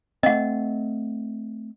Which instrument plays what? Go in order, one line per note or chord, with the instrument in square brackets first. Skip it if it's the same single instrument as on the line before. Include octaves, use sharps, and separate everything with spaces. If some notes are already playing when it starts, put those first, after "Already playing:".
[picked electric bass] A3 C4 [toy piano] D#5 F#5